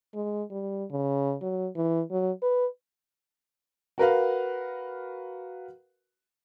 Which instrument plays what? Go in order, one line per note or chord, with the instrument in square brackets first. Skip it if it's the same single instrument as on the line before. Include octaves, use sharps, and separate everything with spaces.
[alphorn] G#3
G3
C#3
F#3
E3
F#3
B4
[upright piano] F#4 A#4 B4 F5